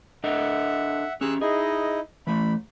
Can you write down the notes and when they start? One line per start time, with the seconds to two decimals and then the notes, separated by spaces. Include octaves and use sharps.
0.24 D4 A4 D#5 E5 F#5
1.21 C#4 G4 G#4 E6 F#6
1.41 D#4 E4 G#4 D#5
2.27 E3 A3 B5